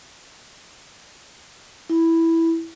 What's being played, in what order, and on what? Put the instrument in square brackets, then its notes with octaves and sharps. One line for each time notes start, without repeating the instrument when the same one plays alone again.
[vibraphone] E4